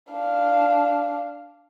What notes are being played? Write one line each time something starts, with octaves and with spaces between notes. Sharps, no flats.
D4 F5